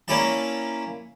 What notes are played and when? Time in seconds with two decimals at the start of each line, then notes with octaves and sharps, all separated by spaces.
0.08 A#3 C#4 E4 D5 A5